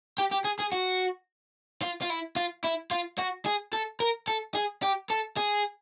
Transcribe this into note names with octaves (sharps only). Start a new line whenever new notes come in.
G4
G4
G#4
G#4
F#4
F4
F4
E4
F4
E4
F4
F#4
G#4
A4
A#4
A4
G#4
G4
A4
G#4